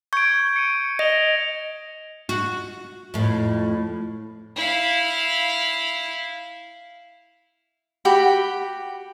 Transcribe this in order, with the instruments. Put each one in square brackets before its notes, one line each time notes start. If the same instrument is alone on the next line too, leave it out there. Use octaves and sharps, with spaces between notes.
[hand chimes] C#6 G6 [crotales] G#6 D7
[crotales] C#7 D#7
[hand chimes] D#5 [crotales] A#6 F7 G7
[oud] F#4
F2 A2
[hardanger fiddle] E4 F5
[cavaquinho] F#4 G4 G5 B5